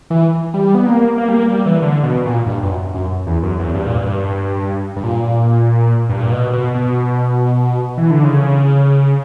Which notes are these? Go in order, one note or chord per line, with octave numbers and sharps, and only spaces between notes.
E3
G3
B3
A#3
A#3
G3
A#3
G3
E3
D3
B2
A#2
G2
F#2
F#2
E2
F#2
E2
G2
A#2
G2
G2
A#2
G2
A#2
B2
B2
B2
E3
D3
C#3